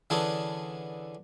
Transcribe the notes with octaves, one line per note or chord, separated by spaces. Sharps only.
D3 E3 C#4 D4 G#4 A4